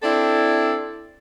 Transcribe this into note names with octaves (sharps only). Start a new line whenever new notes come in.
C4 D4 E4 A4